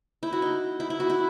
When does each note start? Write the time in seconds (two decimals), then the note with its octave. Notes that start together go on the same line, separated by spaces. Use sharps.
0.23 E4
0.33 F#4
0.42 D#4
0.80 E4
0.90 E4
1.00 F#4
1.10 E4